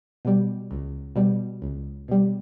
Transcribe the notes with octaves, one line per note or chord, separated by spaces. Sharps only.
B2 G3
C#2
B2 G3
C#2
B2 G3